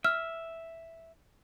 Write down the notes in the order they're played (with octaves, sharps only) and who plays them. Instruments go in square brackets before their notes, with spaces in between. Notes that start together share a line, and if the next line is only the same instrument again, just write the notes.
[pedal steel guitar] E5 [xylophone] F6